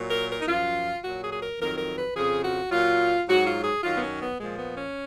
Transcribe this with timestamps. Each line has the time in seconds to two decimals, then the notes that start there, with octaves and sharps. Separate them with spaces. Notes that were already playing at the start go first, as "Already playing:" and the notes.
Already playing: A#2 F#3
0.11 A#4
0.30 A#4
0.40 D#4
0.48 F#2 F3 F4
1.03 A#2 F#3 F#4
1.22 G#4
1.32 G#4
1.41 A#4
1.60 F2 D#3 F#3 A#4
1.78 A#4
1.97 B4
2.15 F2 C#3 F3 G#4
2.44 F#4
2.72 A#2 F#3 F4
3.28 G#2 F#3 F#4
3.46 F4
3.64 G#4
3.83 F#2 D#3 F#3 F4
3.95 B3
4.02 C#4
4.20 B3
4.39 A#2 F3 G#3
4.58 B3
4.76 C#4